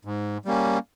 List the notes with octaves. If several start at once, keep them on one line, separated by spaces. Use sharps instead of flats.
G#2
G3 A#3 C#4